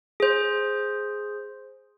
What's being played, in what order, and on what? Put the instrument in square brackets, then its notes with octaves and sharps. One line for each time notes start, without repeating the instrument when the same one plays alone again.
[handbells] G#4 C5